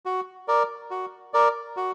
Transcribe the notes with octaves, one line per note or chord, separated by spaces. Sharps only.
F#4
A#4 D5
F#4
A#4 D5
F#4